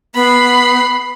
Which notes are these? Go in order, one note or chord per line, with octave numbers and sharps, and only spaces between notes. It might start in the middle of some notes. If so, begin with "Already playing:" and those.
B3 B5 C7